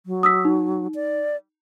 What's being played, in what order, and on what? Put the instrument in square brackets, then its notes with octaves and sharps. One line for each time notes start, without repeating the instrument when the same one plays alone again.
[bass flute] F#3
[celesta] D#6 E6 B6
D#4
[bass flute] D5